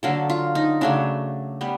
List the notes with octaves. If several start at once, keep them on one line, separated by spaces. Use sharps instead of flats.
D3 F#3 A#3 A4
F4
D#4
C#3 F#3 A3 D4
G3 B3